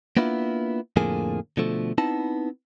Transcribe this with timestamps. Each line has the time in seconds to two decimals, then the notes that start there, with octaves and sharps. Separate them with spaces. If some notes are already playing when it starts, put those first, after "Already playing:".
0.17 A#3 B3 D4 E4 F4
0.96 F2 A2 D3 F3 A#3 G#4
1.57 B2 D3 F3 A3
1.98 B3 C4 D#4 E4 A5